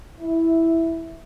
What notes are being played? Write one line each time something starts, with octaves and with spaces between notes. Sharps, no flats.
E4